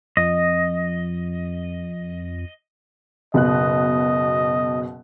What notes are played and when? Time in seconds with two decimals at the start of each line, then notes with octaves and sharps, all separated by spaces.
0.17 F2 D#5
3.34 F#1 B2 D#5 F#6